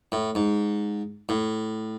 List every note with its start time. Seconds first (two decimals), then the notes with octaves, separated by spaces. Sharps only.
0.12 A2
0.35 G#2
1.29 A2